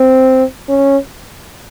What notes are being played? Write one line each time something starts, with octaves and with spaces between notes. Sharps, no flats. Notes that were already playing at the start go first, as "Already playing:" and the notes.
Already playing: C4
C#4